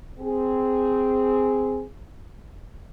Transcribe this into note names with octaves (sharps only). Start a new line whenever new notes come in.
C4 G#4